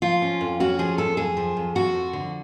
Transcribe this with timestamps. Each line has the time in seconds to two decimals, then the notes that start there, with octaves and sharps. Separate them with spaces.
0.02 F3 F4
0.22 C#4
0.41 F2
0.60 C#4 F#4
0.79 F3 G#4
0.98 F2 A4
1.17 F2 G#4
1.37 F3
1.57 F2
1.75 F2 F#4
1.94 F3
2.13 D3